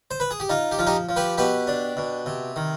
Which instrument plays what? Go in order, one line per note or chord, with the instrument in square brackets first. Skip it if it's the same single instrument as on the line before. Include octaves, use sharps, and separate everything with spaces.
[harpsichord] C5
B4
G#4
G4
D#4 F4
G4
F3 F4
D#4 G4
F3
G4 B4
B2 G4 B4
D4
B2
C3
D#3